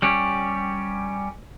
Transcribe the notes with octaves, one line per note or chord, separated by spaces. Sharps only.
G3 C#4 G4